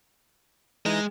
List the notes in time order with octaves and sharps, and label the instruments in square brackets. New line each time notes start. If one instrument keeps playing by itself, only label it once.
[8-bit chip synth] E3 D#4 A#6 [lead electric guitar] G#3